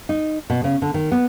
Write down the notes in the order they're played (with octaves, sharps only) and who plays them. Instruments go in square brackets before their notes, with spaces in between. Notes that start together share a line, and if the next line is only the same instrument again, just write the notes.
[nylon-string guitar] D#4
B2
C#3
D3
D#3
B3